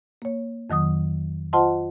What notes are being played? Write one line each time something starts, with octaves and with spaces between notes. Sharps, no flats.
A#3 C#5
F2 D#3 F#3 D#6
F4 C5 D#5 F#5 A5 C6